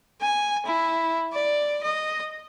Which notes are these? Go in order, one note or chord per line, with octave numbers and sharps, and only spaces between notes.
G#5
E4
D5
D#5